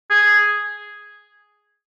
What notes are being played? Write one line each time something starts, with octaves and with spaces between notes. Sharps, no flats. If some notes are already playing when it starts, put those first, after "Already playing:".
G#4